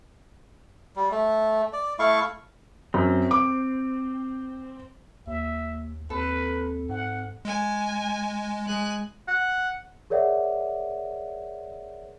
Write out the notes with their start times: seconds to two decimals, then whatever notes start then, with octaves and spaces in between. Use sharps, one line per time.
0.96 G3
1.11 A3
1.73 D5
1.99 A3 E4 F5 C#6
2.94 F#2 C4
3.31 D6
5.27 D#2 A#3 E5
6.10 D#2 C4 A4 B4
6.89 G#2 F#5
7.45 G#3 G#5
8.66 G#3 G#5 F#6
9.28 F#5
10.10 G#4 A#4 C#5 D5 E5 F#5